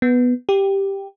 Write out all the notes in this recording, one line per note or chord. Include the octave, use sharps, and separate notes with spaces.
B3
G4